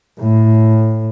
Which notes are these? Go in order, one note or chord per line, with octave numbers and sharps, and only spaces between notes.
A2